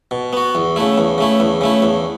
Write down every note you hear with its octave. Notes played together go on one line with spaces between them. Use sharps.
B2
B3 F#4
E2
C#3 A3 E4
E2
C#3 A3 E4
E2
C#3 A3 E4
E2